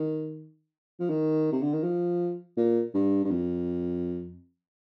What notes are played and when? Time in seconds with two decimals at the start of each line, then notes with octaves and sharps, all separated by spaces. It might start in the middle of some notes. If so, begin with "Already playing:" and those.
Already playing: D#3
1.00 F3
1.09 D#3
1.52 C3
1.62 D3
1.73 D#3
1.84 F3
2.57 A#2
2.94 G2
3.25 G2
3.31 F2